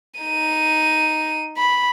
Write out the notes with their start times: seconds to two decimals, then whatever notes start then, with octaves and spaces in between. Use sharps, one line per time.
0.21 D#4 D#7
1.57 B5